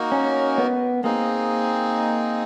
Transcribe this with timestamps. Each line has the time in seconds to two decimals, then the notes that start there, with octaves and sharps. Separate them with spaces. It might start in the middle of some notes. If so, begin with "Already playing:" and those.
Already playing: A#3 D#4 F#4 A#4
0.12 C#4
0.58 B3
1.04 A#3 C4 D#4 G#4